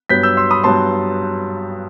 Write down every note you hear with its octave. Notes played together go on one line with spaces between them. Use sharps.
G2 F#3 B3 G6 B6
E6 G6
C6 E6
B5 D#6
G2 F#3 B3 A5 C6